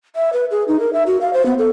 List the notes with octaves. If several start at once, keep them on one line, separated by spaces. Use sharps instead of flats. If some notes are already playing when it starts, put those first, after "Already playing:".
E5
B4
G#4
D#4
A#4
E5
F#4
F5
C5
B3
A4